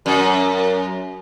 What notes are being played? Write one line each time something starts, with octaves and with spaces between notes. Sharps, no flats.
F#2